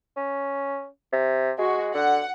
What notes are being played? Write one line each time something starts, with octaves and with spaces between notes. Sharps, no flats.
C#4
C3
G#3 F#4
D3 F#5